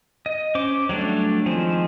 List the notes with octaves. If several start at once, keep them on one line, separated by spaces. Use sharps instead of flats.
D#5
C#4 C5 D6
F#3 G3 A3 D4
D#3 F3 G#3 C4